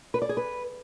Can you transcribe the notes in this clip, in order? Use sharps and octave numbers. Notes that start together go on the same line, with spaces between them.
B4
D5
G#4
B4